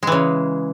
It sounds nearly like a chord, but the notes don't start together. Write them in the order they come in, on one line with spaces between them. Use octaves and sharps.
G#3 E3 C#3